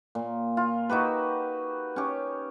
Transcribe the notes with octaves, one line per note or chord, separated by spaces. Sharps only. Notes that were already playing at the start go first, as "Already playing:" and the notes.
A#2
F4
D#4 F#4 G4 B4
C#4 G4